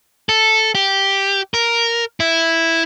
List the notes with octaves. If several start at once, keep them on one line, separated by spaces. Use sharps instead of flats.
A4
G4
A#4
E4